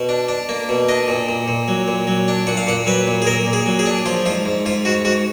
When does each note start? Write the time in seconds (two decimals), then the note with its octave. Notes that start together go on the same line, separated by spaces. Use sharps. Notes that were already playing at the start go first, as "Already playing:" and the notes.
Already playing: B2
0.09 D4
0.29 D4
0.49 A#3
0.69 B2
0.89 D4 D#5
1.08 A#2
1.29 A#2
1.48 A#2
1.68 F#3
1.88 A#2
2.07 F#3
2.28 D4
2.47 A#2 F#5
2.57 F5
2.67 A#2 F#5
2.86 F#3 B4
3.08 A#2
3.22 G#4
3.26 A#2 A#4
3.47 A#2
3.53 G#4
3.66 F#3
3.79 G#4
3.86 D4
4.06 F3 F4
4.26 G#2 F4
4.45 G#2
4.66 G#2 F4
4.85 G#2 F#4
5.05 G#2 F#4